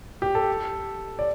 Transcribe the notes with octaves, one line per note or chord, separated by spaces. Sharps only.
G4
A4
D5